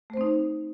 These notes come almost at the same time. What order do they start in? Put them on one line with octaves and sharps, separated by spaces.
A3 C5 C4 D#4